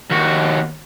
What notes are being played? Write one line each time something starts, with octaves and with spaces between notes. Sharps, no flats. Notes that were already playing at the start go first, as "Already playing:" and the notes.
D#2 F#4